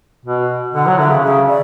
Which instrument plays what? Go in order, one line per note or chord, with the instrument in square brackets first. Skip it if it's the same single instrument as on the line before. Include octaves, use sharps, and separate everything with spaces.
[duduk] B2
[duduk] D3 [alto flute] F#5
[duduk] F#3
[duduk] D3 [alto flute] E5
[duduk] C#3
[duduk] C#3 [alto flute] E5
[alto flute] D5